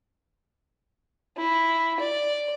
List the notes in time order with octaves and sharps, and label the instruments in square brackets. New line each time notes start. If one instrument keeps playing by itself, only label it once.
[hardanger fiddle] E4
D5